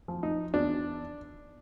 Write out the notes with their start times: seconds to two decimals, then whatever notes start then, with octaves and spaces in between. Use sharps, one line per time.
0.08 F3
0.23 D#4
0.54 E2 D4